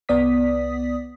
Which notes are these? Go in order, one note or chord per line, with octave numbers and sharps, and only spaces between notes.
C2 B3 D5 D#6 B6